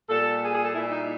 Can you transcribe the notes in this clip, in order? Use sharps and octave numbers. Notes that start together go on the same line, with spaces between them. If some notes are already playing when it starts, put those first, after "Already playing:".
A#2 G3 A4
G#4
G#4
A4
A#2 G3 E4
D#4